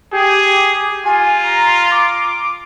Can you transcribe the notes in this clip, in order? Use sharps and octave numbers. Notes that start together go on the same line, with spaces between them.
G4 G#4
F4 G#5
A#5
D6